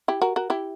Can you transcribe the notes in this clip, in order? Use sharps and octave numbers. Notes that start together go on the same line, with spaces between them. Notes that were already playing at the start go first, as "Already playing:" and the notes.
E4 G4
F#4 A#4
F#4 A#4
E4 G4